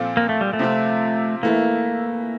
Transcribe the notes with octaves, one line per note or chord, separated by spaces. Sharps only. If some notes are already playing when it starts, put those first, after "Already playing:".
Already playing: A#2 F3 C4 F4 A4
A#3
A3
G3
A3
C3 F3 C4 F4
E3 A3 A#3 E4